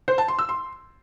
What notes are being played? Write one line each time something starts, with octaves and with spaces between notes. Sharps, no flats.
C5
A5
C6
E6
C6